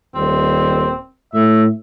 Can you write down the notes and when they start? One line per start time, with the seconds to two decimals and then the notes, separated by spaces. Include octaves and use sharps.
0.14 D#1 C4
1.33 A2 E5